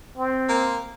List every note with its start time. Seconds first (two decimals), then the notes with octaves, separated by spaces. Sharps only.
0.18 C4
0.49 A#3